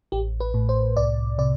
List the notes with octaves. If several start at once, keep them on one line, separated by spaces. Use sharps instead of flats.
A1 G4
B4
A2
C5
C2 D5
C3 D5